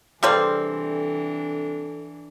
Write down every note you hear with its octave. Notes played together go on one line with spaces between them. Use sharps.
C3 E3 G3 C4 D4 G#4 A4 B4